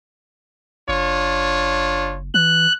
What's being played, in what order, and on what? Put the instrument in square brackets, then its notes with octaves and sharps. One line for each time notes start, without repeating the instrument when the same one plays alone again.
[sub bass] F#1 [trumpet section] D4 F4 C#5
[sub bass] E3 [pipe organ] F#6